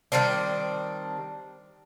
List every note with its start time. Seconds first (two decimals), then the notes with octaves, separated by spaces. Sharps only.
0.12 D#3 G3 C4 D4